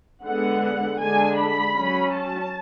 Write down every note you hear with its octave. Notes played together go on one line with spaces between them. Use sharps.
D3 G#3 B3 F#5
D3 G#3 D4 G#5
B5
F#3 C#4
A5